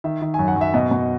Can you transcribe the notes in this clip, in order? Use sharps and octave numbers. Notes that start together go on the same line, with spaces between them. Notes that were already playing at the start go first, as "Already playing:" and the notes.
D#3 E5
D#3
F#2 G#5
F#5
F#2
E5
B2 D#5
B2